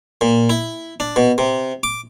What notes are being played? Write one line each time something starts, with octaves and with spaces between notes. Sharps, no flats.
A#2
E4
D4
B2
C3
D6